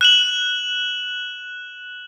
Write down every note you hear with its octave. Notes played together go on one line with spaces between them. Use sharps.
F#6 E7 F#7